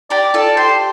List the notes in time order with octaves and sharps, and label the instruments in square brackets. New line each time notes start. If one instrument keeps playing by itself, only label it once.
[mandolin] G4 A#4 [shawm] D5
[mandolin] F4 A4 [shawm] D5
[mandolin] G4 [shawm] C5